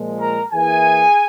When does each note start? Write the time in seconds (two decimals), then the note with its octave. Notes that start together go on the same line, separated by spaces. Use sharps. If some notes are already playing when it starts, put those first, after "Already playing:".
Already playing: A#2 F3 G#3
0.20 A#4 A#5
0.52 E3 A#3 E4 G#4 G#5